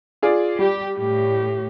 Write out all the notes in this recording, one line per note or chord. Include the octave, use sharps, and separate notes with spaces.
F4 G#4 D5
G3 G4
A2 G4